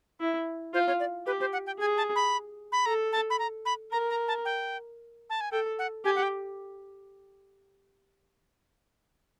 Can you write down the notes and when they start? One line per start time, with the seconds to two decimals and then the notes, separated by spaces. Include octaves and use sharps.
0.20 E4
0.74 F4 C5
0.87 C#5
1.00 D5
1.26 G4 B4
1.40 C5
1.53 F#5
1.66 G5
1.79 G#4 G#5
1.97 A5
2.16 B5
2.72 B5
2.85 A4 A#5
3.12 A5
3.30 B5
3.39 A#5
3.65 B5
3.92 A#4 A#5
4.10 A#5
4.28 A5
4.45 G5
5.30 A5
5.41 G#5
5.51 A4 G5
5.79 F#5
6.05 G4 G#5
6.15 F#5
6.23 G5